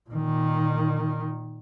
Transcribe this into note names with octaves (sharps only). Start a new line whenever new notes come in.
A#2 D#3